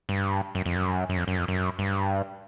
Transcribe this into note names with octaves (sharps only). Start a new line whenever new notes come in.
G2
F#2
F2
F#2
F#2
F2
F#2
F2
F#2
G2